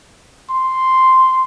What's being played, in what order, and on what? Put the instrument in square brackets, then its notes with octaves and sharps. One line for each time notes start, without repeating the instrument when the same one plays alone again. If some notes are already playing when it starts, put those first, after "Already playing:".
[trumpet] C6